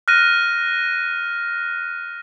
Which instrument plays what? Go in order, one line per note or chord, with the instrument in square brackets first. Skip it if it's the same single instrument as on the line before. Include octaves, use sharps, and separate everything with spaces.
[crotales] F6 F#6 A#6 D#7